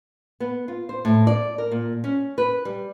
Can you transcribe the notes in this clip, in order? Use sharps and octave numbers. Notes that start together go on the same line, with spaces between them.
B3
F4
C5
A2
D5
A#4
A#2
C#4
B4
G3